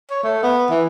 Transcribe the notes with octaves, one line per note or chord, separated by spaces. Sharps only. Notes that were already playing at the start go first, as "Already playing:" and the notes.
C#5
A3
B3
E3